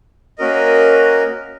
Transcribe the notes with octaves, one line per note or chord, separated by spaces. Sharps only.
A#3 C#4 F#4 A#4 D#5